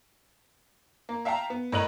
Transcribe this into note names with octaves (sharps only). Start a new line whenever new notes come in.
A#3
E5 F5 G5 A5 A#5
B3
A2 A#4 D#5 F#6 D#7 F#7